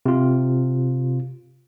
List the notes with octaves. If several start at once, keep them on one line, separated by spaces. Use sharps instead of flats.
C3 F4